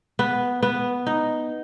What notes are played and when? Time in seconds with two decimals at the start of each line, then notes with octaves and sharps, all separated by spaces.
0.19 B3
0.63 B3
1.07 D#4